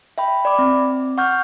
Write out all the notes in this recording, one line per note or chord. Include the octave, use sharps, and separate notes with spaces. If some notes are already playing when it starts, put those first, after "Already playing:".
E5 G5 B5
D5 B5 D6
C4
F#5 C#6 F6 G6